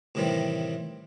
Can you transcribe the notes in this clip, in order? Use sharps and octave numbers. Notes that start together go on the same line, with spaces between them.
A2 C3 D#3 E3 G3 C4